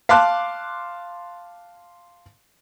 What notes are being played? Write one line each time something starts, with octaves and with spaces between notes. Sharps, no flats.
F5 A5 C6 D6 F#6